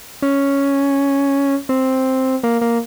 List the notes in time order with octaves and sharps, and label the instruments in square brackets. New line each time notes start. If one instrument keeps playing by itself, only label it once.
[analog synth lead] C#4
C4
A#3
A#3